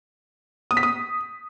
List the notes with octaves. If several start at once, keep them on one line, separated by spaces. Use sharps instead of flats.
D#6
B6
D#6